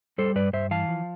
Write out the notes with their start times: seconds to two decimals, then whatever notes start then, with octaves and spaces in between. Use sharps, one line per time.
0.18 G3 A4 C5
0.36 G2 B4 D5
0.53 G2 C5 E5
0.71 E3 F5 A5
0.89 F3